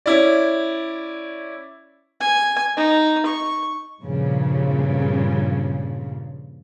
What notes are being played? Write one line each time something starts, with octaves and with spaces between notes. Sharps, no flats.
C#4 E4 D5
G#5
D#4
C#6
G2 A#2 C#3 F3